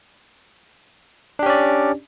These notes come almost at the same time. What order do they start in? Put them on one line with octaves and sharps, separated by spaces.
D4 G4 C#4 D5